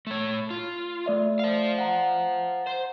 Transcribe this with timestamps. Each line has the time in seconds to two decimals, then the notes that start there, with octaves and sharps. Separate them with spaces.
0.07 A3 C#5
0.51 F4
1.06 A3 D5 E5
1.39 C5 F5
1.78 F#5 A#5
2.67 C5